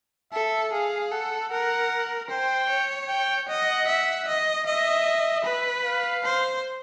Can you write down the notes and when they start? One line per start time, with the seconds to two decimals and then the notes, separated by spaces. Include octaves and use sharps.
0.33 A4 E5
0.72 G#4 F5
1.12 A4 F#5
1.51 A#4 F#5
2.30 C5 G5
2.69 C#5
3.09 G5
3.48 D#5 F#5
3.88 E5
4.27 D#5
4.66 D#5 E5
5.45 B4
5.85 F5
6.24 C5